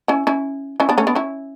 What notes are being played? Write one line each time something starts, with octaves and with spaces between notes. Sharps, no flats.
C#4 E4
C#4 E4
C#4 E4
B3 D4
A3 C#4
B3 D4
C#4 E4